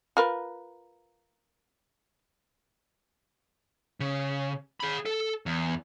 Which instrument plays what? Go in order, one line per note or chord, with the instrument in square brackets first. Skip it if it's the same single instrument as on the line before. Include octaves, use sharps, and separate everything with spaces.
[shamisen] F4 A#4 B4
[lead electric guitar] C#3
G#4 B5
A4
E2